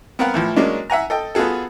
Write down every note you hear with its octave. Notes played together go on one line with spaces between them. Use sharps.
B3 C4 A#4 F5 F#5
A2 E3 F3
F#3 G#3 A#3 C#4 D4
E5 F#5 G#5 A#5
A4 D#5 G5
B3 F4 F#4 G#4 A4